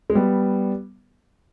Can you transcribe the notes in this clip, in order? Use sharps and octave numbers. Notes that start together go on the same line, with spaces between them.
G#3
G3 B3